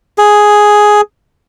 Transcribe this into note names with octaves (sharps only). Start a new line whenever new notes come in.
G#4